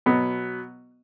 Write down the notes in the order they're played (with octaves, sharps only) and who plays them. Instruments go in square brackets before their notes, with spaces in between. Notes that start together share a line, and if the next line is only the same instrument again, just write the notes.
[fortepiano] B2 F#3 B3